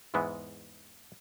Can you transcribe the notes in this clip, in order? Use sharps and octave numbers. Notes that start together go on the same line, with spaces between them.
E2 G#2 E3 G#3 B3